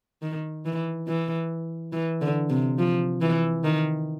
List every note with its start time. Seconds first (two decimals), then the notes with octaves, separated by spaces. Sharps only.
0.23 D#3
0.65 E3
1.08 E3
1.93 E3
2.21 D3
2.50 C3
2.79 F3
3.21 E3
3.64 D#3